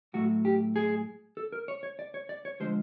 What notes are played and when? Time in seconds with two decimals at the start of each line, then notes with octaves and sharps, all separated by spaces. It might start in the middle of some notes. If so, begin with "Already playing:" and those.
0.14 A2 F#3 A3 F#4
0.45 G4
0.76 G#4
1.37 A4
1.52 A#4
1.68 C#5
1.83 C#5
1.99 D5
2.14 C#5
2.29 D5
2.45 C#5
2.60 D3 F3 G#3 C5